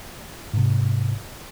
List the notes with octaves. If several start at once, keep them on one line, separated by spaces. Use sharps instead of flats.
G#2 C3